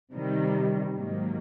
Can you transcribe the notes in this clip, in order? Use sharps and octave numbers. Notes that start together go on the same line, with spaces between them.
C3 D#3 G3
G#2 D#3 F#3 A#3